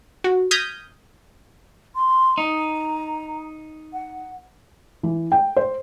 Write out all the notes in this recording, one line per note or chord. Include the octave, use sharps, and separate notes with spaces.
F#4
D#6 F6 G6 G#6 A#6 B6
C6
D#4 A#5
F#5
E3
G5
C5